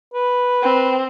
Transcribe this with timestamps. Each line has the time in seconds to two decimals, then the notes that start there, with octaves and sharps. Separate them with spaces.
0.14 B4
0.62 C4